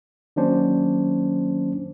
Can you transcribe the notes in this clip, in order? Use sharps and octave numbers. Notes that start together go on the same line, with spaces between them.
D#3 F#3 A#3 C#4 D4 C5